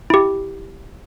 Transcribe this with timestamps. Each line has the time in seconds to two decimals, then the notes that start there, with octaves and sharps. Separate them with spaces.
0.10 E4 G4